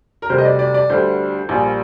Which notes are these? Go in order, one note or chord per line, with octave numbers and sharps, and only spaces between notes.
A#4
D2 C3 G3 C5
D#5
D5
D5
D5
D2 D3 G3 C5
A#1 A#2 G3